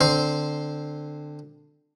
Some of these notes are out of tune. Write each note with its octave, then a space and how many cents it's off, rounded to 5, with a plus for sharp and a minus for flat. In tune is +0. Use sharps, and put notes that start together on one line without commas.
D3 +15 C4 +0 C5 +0